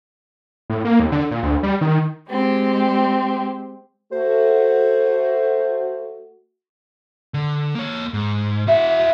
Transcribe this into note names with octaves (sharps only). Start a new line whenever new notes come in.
A2
A#3
D#2
D3
A#2
D2
G3
D#3
G#3 C4 G4
A3 F#4 C5
D3
A#3 C#5
G#2
E4 F#4 E5